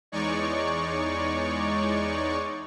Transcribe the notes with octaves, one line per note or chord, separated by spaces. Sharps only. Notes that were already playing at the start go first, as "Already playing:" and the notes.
E2 G#3 D#4 C#5 D5 C#6